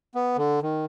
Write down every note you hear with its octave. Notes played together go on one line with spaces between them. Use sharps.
B3
D3
D#3